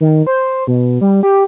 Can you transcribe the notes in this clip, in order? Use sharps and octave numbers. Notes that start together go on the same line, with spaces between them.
D#3
C5
B2
G3
G4